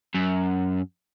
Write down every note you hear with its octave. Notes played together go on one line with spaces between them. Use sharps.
F#2